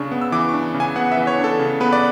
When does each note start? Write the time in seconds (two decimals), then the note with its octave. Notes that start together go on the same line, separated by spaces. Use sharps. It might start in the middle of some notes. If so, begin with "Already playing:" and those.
Already playing: C#3 D4 C#6
0.11 B3
0.22 E6
0.32 E3 D6
0.49 D4 C#6
0.74 C#3
0.80 G#5
0.96 B3 F#5
1.12 E5
1.17 E3
1.27 C#5
1.39 D4
1.44 A4
1.59 C#3
1.80 B3 B4
1.92 D5